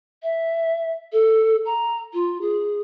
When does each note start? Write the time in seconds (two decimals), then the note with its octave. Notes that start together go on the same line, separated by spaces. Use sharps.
0.23 E5
1.13 A4
1.66 A#5
2.13 F4
2.41 G#4